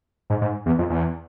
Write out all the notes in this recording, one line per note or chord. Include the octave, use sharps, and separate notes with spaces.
G#2
G#2
E2
F2
E2